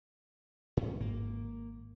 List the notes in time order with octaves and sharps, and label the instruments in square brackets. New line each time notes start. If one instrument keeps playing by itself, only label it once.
[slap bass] G#2 C#4
[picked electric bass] G#1 [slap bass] A#3